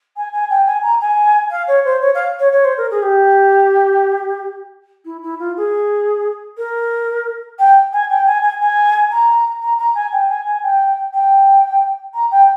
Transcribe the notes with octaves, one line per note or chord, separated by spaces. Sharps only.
G#5
G#5
G5
G#5
A#5
G#5
F5
C#5
C5
C#5
F5
C#5
C#5
C5
A#4
G#4
G4
E4
E4
F4
G#4
A#4
G5
G#5
G5
G#5
G#5
G#5
A#5
A#5
A#5
G#5
G5
G#5
G#5
G5
G5
A#5
G5